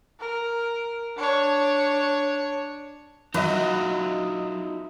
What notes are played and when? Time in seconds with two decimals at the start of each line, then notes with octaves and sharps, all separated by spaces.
0.20 A#4
1.17 D4 C#5
3.34 F#3 D#4 F4 F#4 B4 D#5 E5